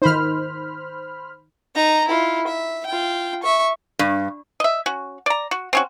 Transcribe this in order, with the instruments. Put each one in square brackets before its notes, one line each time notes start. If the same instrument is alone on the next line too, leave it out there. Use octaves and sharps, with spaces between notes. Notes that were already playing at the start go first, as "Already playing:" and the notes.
[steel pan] D#3 D#4 [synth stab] C5 B5 F6
[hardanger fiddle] D#4 A#5
E4 F4
E5
F4 G5
E5 C#6
[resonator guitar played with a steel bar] G2
[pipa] D#5 E5
C#4 F#4
D5 A#5
F#4
C4 C#4 F#4